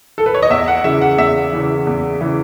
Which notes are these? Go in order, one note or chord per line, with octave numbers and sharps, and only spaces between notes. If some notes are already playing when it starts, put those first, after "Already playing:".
A4
B4
C#5
D#5
E2 E5
F#5
C#3 E3 E5
F#5
E2 E5
C#3 E3
E2
C#3 E3